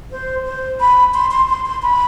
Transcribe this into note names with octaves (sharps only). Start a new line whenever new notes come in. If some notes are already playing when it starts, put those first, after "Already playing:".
C5
C5
B5
C6
C6
C6
C6
B5